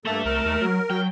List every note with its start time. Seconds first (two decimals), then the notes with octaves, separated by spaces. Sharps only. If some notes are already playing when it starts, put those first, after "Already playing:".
0.05 G2 A3 A#3 A4 E5
0.25 C2 A#4
0.45 D#2
0.61 F#3
0.90 F#3 G5